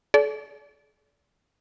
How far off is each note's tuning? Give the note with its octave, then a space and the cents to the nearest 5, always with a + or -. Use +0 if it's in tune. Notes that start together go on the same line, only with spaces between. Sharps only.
A4 -40 D5 -35